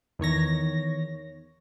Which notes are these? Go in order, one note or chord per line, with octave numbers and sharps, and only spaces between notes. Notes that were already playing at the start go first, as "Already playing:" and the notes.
E2 D#3 C#5 A#6